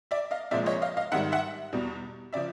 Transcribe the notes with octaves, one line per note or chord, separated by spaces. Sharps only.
D5 E5
D#5 F5
C2 A#2 F3 G#3 D5 E5
C#5 D#5
D#5 F5
D#5 F5
G#2 D#3 G3 E5 F#5
E5 F#5
E2 B2 G3
C#3 F3 D5 E5